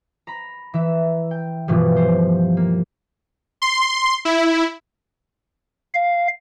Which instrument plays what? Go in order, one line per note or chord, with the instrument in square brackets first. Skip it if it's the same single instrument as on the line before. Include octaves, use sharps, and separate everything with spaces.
[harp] A#5 B5
E3 E5
G5
G2 B2 E3 F3
C5
A#3
[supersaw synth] C6
E4
[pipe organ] F5